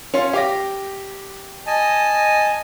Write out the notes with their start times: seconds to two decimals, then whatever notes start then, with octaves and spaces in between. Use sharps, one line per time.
0.14 C#4 F4 C#5
0.33 G4 F5 D6 A#6
1.67 D#5 G#5 A5